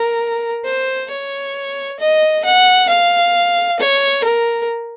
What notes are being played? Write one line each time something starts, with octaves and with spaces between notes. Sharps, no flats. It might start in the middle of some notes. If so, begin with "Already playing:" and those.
Already playing: A#4
C5
C#5
D#5
F#5
F5
C#5
A#4